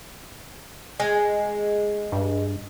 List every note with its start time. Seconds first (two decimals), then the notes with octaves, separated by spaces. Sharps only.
1.00 G#3
2.12 G2